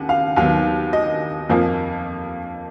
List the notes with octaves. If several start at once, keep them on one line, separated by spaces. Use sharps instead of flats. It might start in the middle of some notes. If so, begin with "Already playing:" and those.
Already playing: D#2 C#3 F#5
F5
D#2 D#3 F#3 B3 F5
D#5
F2 F3 A#3